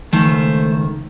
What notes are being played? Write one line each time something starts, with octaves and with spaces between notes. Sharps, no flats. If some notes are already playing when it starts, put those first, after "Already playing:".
C#2 D#3 A3 C5